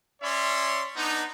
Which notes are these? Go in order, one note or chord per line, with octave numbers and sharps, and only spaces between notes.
C#4 C#5 D5 E5 C6
B3 D4 D#4